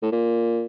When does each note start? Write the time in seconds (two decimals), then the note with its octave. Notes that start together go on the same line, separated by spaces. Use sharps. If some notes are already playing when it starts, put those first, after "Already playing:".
0.02 A2
0.12 A#2